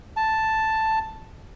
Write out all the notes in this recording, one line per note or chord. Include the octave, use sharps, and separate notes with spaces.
A5